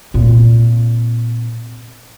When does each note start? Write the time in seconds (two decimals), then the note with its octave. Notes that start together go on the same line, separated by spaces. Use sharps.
0.14 A#2 C4